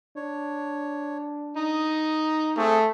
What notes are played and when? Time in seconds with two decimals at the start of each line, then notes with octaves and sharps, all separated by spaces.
0.16 D4 C#5
1.57 D#4 D#6
2.57 A3 C4 G#4